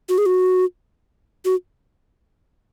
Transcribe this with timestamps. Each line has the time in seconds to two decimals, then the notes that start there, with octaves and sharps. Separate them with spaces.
0.09 F#4
0.18 G#4
0.26 F#4
1.45 F#4